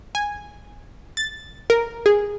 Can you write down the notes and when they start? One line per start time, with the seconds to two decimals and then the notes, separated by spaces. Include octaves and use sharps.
0.15 G#5
1.17 A6
1.70 A#4
2.06 G#4